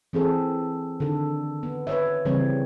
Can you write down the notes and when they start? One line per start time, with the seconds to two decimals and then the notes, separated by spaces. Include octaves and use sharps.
0.13 E3 C4 G#4 A4
1.00 D3 D#3 A4
1.63 B3
1.87 B4 C#5 E5
2.25 C#3 E3 G3 C4 C#5